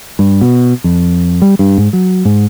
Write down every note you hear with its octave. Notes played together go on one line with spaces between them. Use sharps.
G2
B2
F2
G3
G2
G#2
F#3
G#2